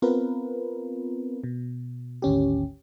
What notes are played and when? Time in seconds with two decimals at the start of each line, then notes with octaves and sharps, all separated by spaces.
0.02 B3 C4 F4 A#4 B4
1.44 B2
2.22 G#1 D2 C#4 G4